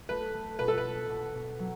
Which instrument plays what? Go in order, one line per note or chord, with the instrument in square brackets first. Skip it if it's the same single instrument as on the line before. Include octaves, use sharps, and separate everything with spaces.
[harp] A3 [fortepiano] B4
[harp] A3
[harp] B2 [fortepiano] B4
[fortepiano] A4
B4
[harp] A3
B2
B2
F#3